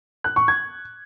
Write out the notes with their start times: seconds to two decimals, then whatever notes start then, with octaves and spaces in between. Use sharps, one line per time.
0.24 F#6
0.36 C#6
0.48 G#6